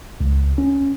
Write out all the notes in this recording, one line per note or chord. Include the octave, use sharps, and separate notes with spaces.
C#2
C#4